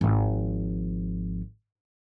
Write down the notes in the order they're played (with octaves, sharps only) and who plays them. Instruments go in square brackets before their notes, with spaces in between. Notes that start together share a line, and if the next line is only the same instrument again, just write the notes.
[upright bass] G#1 F3